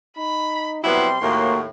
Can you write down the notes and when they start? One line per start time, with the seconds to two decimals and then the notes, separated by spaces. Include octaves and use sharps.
0.18 D#4 B5
0.84 C3 F#3 G3 B3 E4 C6
1.22 D#2 A2 A#3 F#4